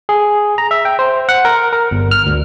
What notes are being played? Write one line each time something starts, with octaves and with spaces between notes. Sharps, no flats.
G#4
A#5
E5
G5
C5
F#5
A#4
A#4
G1
F6
D2